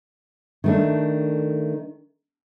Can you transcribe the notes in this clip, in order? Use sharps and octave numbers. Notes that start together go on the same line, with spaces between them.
D#3 A3 D4